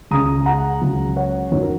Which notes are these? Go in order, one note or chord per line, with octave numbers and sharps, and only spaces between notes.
C#2 C#3 G#3 A#5 D#6
F#5 A#5
C#2 C#3 F#3
C#5 F#5
F#2 D#3 F#3 C#5
A#4